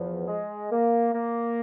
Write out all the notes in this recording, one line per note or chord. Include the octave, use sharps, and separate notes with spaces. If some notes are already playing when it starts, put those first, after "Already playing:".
Already playing: E2 F3
G#3
A#3
A#3